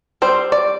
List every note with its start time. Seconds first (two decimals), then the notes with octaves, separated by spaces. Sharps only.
0.22 G3 C4 C5
0.52 D5